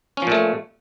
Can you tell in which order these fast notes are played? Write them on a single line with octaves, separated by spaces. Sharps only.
C#4 F3 A#2 A3